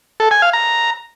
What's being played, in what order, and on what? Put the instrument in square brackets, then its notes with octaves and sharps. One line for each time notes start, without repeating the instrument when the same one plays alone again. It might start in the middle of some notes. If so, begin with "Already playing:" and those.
[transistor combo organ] A4
G#5
F5
A#5